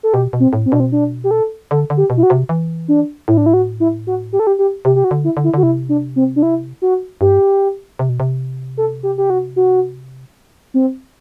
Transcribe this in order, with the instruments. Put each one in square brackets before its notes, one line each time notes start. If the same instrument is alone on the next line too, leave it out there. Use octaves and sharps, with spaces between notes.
[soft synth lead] A4
[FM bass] B2 [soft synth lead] G4
[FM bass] B2
[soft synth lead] C4
[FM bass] A2
[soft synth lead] C4
[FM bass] B2 [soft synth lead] D4
[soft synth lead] C4
D4
G4
A4
[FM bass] D3 [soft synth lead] A4
[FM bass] D3
[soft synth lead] G4
[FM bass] B2
[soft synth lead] E4
F#4
[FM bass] C3
E3
[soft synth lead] D4
[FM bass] A2 [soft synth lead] E4
[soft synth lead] D4
E4
F#4
E4
F#4
G4
A4
G4
G4
[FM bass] C3 [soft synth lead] G4
[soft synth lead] G4
F#4
[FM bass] D3
[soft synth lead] E4
[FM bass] D3
[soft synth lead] E4
[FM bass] D3 [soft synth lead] F#4
[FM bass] C3 [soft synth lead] E4
[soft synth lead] D4
C4
D4
E4
F#4
[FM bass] G2 [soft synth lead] G4
[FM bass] C3
B2
C3
[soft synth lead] A4
G4
G4
F#4
F#4
C4